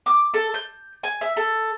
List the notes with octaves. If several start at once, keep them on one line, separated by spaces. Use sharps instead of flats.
D6
A4
G6
G#5
E5
A4